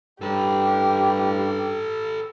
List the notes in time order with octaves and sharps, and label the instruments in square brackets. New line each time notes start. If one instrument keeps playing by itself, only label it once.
[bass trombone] G2 [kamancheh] G4 [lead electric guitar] A4 B4